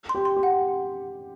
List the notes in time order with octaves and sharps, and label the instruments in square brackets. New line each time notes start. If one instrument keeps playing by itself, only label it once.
[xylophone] C6
[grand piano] G4
[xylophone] C6
[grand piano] G4
[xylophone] F#5